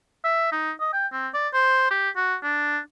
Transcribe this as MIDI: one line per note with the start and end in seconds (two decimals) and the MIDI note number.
0.24 0.50 76
0.52 0.72 63
0.80 0.92 75
0.93 1.07 79
1.13 1.28 60
1.34 1.49 74
1.53 1.86 72
1.91 2.10 67
2.16 2.36 66
2.43 2.80 62